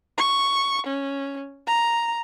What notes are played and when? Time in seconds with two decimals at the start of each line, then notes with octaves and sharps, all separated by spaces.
0.18 C#6
0.87 C#4
1.67 A#5